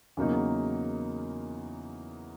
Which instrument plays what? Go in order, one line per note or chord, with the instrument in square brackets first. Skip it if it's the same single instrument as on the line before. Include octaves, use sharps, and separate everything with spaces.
[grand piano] E2 C#3 F#3 A#3 D#4